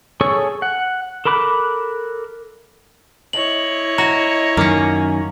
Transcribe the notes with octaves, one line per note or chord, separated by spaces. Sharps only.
G#4 A4 C#5 C#6
F#5
A4 A#4 B5 D6 F#6
E4 C#5 D#5 F#7
F#4 A#5
F#2 D#3 A#3 C#4